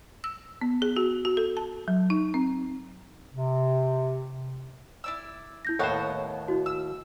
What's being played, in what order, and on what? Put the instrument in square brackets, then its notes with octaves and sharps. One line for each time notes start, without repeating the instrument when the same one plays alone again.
[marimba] E6
B3
G#4
F#4
F#4
A4
A5
F#3
D#4
C4
[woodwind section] C3
[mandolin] E4 D5 E6
[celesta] E4 G6 A#6
[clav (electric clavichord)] D#2 A2 C5 [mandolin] B3 C#5 F#5 [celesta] A4 F#6
[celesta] E4 F#4
[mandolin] E6